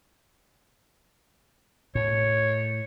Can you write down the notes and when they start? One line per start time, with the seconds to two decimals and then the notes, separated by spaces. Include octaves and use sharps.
1.95 A2 C#5